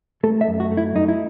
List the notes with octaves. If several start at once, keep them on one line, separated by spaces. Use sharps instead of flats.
A3 A4
E5
F#2
F#4
A3
E4
F#2 D#4
E4